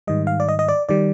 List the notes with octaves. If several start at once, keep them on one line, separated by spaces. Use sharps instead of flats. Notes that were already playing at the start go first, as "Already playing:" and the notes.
G#2 D#3 G3 D#5
F5
D5
D#5
D#5
D5
D#3 G3 D5